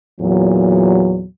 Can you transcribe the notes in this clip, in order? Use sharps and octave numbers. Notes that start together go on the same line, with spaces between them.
E2 A#2 F#3